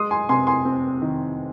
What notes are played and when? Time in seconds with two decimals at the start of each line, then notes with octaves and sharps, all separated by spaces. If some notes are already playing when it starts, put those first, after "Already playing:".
Already playing: G#3 C6 D#6
0.11 G#5 C6
0.29 C3 G#5 C6
0.47 G#5 C6
0.65 C4
1.02 D#3